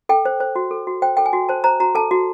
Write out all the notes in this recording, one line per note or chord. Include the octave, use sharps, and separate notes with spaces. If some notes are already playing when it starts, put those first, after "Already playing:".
A4 G5
C5
C5
F#4
A4
F#4
C5 G5
A4 G5
G#5
F#4
C5 A5
C5 A#5
F#4 A#5
A4 A5
F#4